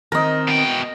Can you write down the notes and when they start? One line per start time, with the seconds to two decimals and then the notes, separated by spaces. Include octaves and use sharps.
0.12 D#3 C4 A#4 D#5
0.48 B2 G5